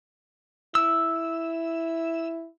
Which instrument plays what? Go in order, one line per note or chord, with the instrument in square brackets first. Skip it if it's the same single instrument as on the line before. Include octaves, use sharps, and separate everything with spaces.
[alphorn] E4 [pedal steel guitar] E6